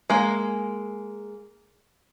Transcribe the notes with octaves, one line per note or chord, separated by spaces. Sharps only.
G#3 A#3